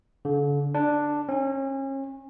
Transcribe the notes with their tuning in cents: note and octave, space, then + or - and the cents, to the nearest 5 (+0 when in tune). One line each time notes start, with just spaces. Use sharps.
D3 -40
D4 +5
C#4 -35